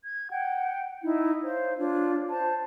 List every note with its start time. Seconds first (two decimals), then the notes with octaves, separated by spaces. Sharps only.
0.04 G#6
0.30 F#5 G5
1.03 D#4 E4
1.44 C5 C#5 F5
1.78 D4 F4 C#5
2.30 C5 A5